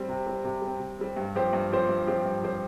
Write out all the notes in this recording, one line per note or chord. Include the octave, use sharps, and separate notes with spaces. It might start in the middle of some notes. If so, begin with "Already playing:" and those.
Already playing: G3 C4
C3
G3 C4
C3
G3 C4
C3
G3 C4
G2
F3 C4 G4 C5
G2
F3 C4 G4 C5
G2
F3 C4 G4 C5
G2
F3 C4 G4 C5